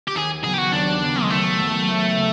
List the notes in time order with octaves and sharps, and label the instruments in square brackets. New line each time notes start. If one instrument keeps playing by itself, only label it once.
[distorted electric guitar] G4
[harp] D#2 [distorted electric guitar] G#4
[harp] C#3 F#3 B3 [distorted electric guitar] G#4
[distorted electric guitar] G4
F#4
[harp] D#2 [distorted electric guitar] D4
[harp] C#3 F#3 B3
[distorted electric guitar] G#3
[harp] D#2 [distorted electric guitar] A3
[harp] C#3 F#3 B3
D#2
C#3